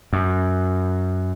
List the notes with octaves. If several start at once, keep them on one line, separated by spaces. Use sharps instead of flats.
F#2